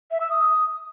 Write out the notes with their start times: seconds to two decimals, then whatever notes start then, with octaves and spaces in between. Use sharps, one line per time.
0.11 E5
0.20 E6
0.30 D#6